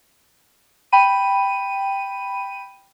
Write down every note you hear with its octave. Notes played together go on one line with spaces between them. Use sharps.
G5 B5 D#7